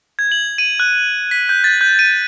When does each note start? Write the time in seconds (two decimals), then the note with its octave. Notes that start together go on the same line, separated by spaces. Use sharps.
0.19 G#6
0.32 F#7
0.58 D#7
0.80 F#6
1.31 B6
1.49 G6
1.64 A6
1.81 G6
1.99 D#7